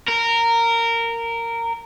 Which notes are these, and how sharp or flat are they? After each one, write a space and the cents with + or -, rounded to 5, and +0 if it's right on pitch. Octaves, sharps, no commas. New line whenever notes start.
A#4 -15